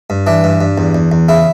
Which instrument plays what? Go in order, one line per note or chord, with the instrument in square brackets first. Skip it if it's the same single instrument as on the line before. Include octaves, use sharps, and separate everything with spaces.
[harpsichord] G2
E3 D4
G2
G2
E2
E2
E2
C#3 E4